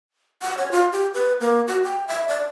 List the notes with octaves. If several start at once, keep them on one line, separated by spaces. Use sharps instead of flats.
F#5
C#5
F4
G4
B4
A#3
F#4
G5
E5
D5